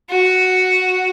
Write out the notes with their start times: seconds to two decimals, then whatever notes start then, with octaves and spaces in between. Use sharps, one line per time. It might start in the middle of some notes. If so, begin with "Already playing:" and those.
0.10 F#4